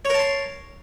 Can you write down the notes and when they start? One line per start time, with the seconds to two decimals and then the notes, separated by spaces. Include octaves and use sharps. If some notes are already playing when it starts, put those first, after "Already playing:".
0.05 C#5
0.10 A#4
0.14 A5
0.19 C6